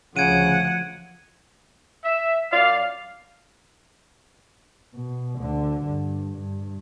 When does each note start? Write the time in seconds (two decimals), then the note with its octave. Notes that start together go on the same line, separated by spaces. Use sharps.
0.16 D2 C#3 F3 F#5 G#6 D7 D#7
2.04 E5
2.52 F#2 D5 F5
4.94 B2
5.38 D2 D3
5.85 G2
6.38 G2